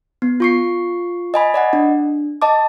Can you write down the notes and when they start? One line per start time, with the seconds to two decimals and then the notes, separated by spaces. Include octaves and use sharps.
0.22 B3
0.40 F4 C#6 C7
1.34 D#5 G#5 B5
1.54 D5 D#5 F#5
1.73 D4
2.42 D#5 A5 D6